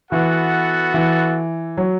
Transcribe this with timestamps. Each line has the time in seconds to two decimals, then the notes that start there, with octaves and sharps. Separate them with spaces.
0.11 E3 B3 F#4 A4 F#5
0.94 E3
1.77 F#3